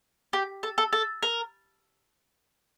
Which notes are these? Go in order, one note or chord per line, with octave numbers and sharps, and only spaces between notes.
G4
A4
A4
A4
A#4